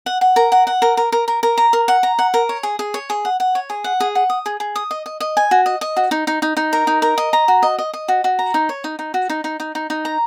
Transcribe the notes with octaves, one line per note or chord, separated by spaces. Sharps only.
F#5
F#5
A#4
F#5
F#5
A#4
A#4
A#4
A#4
A#4
A#5
A#4
F#5
A#5
F#5
A#4
C#5
G#4
G#4
C#5
G#4
F#5
F#5
C#5
G#4
F#5
G#4
F#5
D#6
G#4
G#4
D#6
D#5
D#5
D#5
G#5
F#4
D#5
D#5
F#4
D#4
D#4
D#4
D#4
A#4
D#4
A#4
D#5
A#5
F#4
D#5
D#5
D#5
F#4
F#4
A#5
D#4
C#5
D#4
D#4
F#4
D#4
D#4
D#4
D#4
D#4
A#5